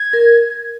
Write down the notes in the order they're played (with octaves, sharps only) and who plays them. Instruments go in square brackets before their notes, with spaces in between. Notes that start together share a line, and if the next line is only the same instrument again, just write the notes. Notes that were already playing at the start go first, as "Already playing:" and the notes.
Already playing: [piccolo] G#6
[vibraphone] A#4